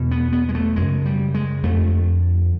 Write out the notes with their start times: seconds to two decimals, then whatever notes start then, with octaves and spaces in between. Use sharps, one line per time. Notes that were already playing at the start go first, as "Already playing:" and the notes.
Already playing: E2 B2
0.11 B3
0.33 B3
0.49 G#3
0.55 A3
0.76 F#2 C#3 G#3
1.05 G3
1.34 G#3
1.63 F2 D3 A3